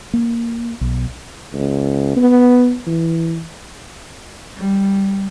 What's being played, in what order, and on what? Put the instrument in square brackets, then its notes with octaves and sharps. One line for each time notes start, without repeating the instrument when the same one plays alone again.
[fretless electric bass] A#3
B1
[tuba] C#2
B3
E3
[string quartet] G3